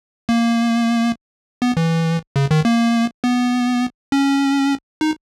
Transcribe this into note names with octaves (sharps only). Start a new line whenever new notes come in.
A#3
B3
E3
C#3
D#3
A#3
B3
C#4
D#4